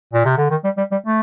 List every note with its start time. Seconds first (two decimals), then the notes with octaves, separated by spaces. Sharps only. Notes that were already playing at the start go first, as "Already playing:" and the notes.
0.13 A#2
0.25 C3
0.38 D3
0.51 D#3
0.64 G3
0.77 G3
0.92 G3
1.06 A3